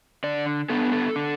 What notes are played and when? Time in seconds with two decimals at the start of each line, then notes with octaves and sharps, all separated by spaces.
0.24 D3 D5
0.69 B3 D4 A4
0.93 A4
1.16 D3